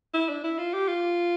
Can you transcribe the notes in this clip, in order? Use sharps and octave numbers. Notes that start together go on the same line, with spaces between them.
E4
D4
E4
F4
G4
F4